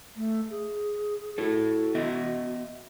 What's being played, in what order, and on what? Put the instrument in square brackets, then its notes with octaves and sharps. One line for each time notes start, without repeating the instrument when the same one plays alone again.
[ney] A3
G#4
[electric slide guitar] E4 A4 [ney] F#4
[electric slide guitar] B3 D#5 E5